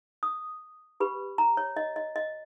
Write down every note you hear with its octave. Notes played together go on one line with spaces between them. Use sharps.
D#6
G4 B4 B5
A#5
C#5
D#5
D#5
D#5